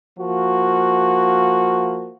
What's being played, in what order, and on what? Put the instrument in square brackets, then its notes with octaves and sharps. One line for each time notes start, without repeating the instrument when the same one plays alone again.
[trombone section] F3 A#3 F#4